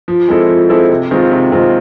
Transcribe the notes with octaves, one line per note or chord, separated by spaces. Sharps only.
F3
G#3 C4 E4 A4
F3
G#3 C4 E4 A4
C3
D#3 G#3 C4 F4
C3
D#3 G#3 C4 F4